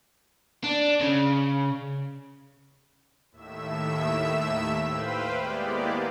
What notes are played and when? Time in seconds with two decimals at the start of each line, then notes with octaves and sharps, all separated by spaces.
0.64 D4
1.01 C#3
3.32 D#2 A2 E5 E6 E7
4.83 B4 C5 F5 G5 B5
5.39 G#3 A#3 B3 E4 G4 D5